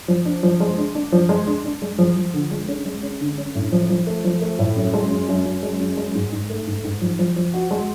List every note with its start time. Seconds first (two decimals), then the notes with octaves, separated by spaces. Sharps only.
0.08 F3
0.25 D4
0.43 F3
0.60 G#3
0.77 D4
0.95 D4
1.12 F3
1.29 G#3
1.47 D4
1.64 D4
1.82 G#3
1.98 F3
2.16 F3
2.34 D3
2.51 G#3
2.68 C#4
2.86 G#3
3.03 C#4
3.20 D3
3.38 C#4
3.55 A2
3.72 F3
3.90 F3
4.07 A3
4.24 F3
4.42 A3
4.59 A2
4.76 F#2
4.94 G#3
5.11 F#2
5.28 F#2
5.46 F#2
5.63 G#3
5.80 F#2
5.97 G#3
6.15 G#2
6.32 G#2
6.50 A3
6.67 G#2
6.84 G#2
7.01 F3
7.19 F3
7.36 F3
7.54 F#4
7.71 G#3